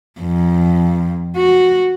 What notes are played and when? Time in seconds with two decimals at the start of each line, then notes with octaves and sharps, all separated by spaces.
0.21 F2
1.36 F#4